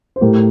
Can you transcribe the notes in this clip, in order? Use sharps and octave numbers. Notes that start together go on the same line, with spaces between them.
C5
A2 G4 A#4